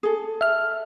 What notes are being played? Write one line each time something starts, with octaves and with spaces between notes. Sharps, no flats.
G#4 A4
E5 F6